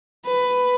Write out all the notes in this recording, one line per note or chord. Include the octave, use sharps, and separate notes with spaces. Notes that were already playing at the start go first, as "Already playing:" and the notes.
B4